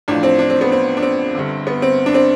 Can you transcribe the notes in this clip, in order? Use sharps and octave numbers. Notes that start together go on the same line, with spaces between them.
A1 A2 F3 D4
C4
D4
C4
B3
C4
D4
C4
G1 G2 D3
B3
C4
D4
C4